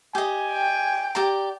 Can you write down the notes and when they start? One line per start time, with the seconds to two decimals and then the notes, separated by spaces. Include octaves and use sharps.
0.15 G4 D#5 G#5
0.52 G5
1.15 G4 D5 A#5